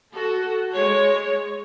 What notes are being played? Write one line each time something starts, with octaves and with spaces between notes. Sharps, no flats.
F#4 A4
G#3 C#5